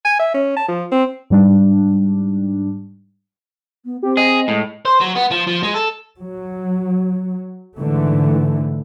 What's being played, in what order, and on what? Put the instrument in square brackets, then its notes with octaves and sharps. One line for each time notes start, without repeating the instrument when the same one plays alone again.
[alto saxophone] G#5
E5
C#4
A5
F3
C4
[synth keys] G#2 G3 D4
[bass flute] B3
[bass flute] C4 [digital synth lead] G4
[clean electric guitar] G#4 [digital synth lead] D#5
[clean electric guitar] A2 [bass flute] G#3
[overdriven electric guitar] C5
F#3
B3
F3
F3
G#3
A4
[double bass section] F#3
G#2 D3 E3 A3